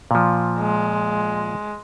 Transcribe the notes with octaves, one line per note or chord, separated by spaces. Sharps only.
A#2 F3
G#3